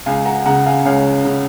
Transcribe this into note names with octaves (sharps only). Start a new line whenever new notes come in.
C#2 F5 G#5
F#5 A#5
C#3 F#5 A#5
F5 G#5
C#2 C#5 F5
C#3